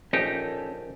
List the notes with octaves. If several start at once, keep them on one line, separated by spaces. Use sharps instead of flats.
A#1 C#4 D#4 G4 A4